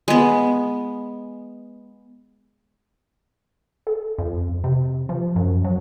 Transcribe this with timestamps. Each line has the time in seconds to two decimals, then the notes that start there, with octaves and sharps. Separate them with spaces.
0.08 G#3 B3
3.87 A4
4.18 F2
4.64 C3
5.09 F3
5.36 F#2
5.64 F#3